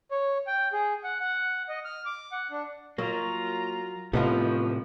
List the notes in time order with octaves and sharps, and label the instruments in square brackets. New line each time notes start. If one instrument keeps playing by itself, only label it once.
[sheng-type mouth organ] C#5
G5
G#4
F#5
F#5
D#5
F6
D6
F#5
D4
[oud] F#3 [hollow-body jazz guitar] A#3 [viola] F4 A#5
[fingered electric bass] A2 C3 [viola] F3 [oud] F#3 D#4 [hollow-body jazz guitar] A3 B3 F4